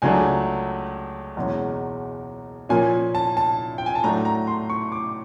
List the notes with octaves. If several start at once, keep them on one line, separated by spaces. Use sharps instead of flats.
C#2 C#3 F#3 A3 D4 G#5
F#1 E2 B2 G#3 C#4
A#2 F3 A#3 C#4 G#5
A5
A5
G5
G#5
A5
A2 F#3 A3 D4 A#5
A#5
C6
C#6
D6